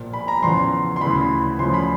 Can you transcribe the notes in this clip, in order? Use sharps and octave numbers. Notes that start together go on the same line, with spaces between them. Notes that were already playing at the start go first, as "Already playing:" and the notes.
Already playing: A#1 A#2 F3
B5
A#5
E2 C#3 F3 C6
C6
D2 C#3 E3 B5
D2 C#3 F3 C6
B5